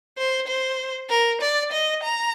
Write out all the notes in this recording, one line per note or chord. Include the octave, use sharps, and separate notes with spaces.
C5
C5
A#4
D5
D#5
A#5